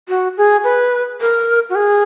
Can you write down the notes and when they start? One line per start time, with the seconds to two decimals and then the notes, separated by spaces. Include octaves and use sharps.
0.09 F#4
0.37 G#4
0.64 B4
1.21 A#4
1.70 F#4
1.75 G#4